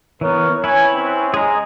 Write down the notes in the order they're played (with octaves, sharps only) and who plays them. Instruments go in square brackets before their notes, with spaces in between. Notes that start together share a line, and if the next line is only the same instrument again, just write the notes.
[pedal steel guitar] E3 B3 [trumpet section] A#4 B4 C#5
[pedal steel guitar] E4 B4 [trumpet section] C#5 G#5
[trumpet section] C4 C#4
[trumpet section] G#3 [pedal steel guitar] G#4 A#5